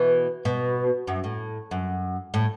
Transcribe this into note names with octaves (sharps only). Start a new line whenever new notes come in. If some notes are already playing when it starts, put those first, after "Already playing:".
Already playing: B2 E3
B2
F#2
A2
F#2
A2